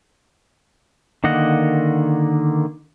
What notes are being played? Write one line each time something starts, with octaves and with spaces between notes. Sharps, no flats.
D3 D#3 A#3 D#5 F#5